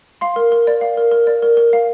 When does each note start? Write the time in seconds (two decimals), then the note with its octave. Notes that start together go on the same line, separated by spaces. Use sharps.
0.21 F5 C6
0.36 A#4
0.52 A#4
0.67 D5
0.81 F5
0.97 A#4
1.11 A#4
1.27 D5
1.42 A#4
1.57 A#4
1.73 F5